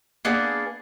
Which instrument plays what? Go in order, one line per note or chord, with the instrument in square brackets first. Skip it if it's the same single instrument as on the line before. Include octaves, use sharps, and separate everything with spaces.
[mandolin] A#3 B3 D4 G#4